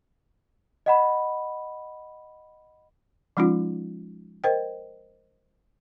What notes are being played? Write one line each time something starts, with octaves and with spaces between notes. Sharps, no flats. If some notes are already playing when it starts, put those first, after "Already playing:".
D#5 F#5 B5
F3 G#3 C#4 D#4 F4
A#4 C5 D#5 G5